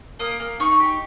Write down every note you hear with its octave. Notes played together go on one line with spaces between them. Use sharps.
A#3 D#6
A#3
D#4 C#6
G4